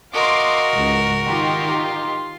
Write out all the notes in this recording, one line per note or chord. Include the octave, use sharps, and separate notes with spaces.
F#4 A#4 D#5 F5 C6 D6
C#2 G#2
D#3 D#4 F4 G4 C6